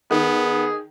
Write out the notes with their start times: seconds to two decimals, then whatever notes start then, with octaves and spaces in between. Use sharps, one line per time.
0.11 D#3 B3 G#4